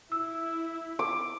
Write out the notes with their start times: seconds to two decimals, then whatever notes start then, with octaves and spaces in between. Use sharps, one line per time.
0.12 E4 E6
0.99 D6